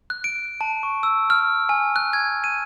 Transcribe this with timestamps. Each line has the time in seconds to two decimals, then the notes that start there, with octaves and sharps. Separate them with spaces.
0.10 F#6
0.24 D7
0.61 A5
0.83 C#6
1.03 E6
1.30 F6
1.69 G#5
1.96 F#6
2.13 G#6
2.44 D#7